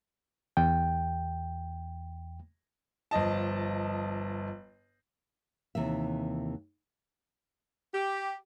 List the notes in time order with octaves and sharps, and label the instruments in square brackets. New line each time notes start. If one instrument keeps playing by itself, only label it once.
[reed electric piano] E2 G5
[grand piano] G1 F3 D#5 A5
[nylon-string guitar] D#2 C3 E3 E5
[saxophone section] G4